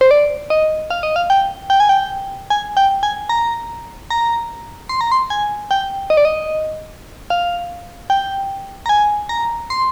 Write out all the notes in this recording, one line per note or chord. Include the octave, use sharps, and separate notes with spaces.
C5
D5
D#5
F5
D#5
F5
G5
G5
G#5
G5
G#5
G5
G#5
A#5
A#5
C6
A#5
C6
G#5
G5
D#5
D5
D#5
F5
G5
A#5
G#5
A#5
C6